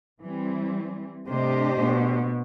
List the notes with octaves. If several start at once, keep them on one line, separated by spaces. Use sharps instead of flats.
E3 G3 C4
C3 A3 D4 G4 C5 D#5
B2